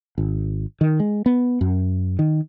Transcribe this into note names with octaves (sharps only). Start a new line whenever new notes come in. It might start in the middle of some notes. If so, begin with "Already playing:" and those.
G#1
D#3
G#3
B3
F#2
D#3